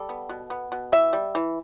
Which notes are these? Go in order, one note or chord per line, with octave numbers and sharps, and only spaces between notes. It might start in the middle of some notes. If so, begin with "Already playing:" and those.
Already playing: G3 A4
B3
B2
B3
B2
E3 E5
G3
E3